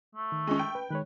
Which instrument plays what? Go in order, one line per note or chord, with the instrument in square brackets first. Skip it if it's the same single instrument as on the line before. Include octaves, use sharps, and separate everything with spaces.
[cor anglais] A3
[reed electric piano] D#3
[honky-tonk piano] G#3 C#4
G5
[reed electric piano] B4
[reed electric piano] D#3 G#3 C#5 [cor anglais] B4